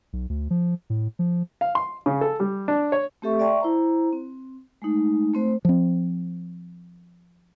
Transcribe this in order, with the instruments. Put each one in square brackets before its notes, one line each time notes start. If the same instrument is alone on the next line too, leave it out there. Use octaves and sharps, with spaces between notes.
[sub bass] B1
D2
F3
A2
F3
[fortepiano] F5
C6
C#3
A4
G3
D4
C#5
[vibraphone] A3 C4 G4 A4 E5 C#6
D5 E5 G5 A5 C6 C#6
E4 C5 A#5
C4
G#3 A3 D#4
A3 C4 C5
[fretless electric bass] F3 C4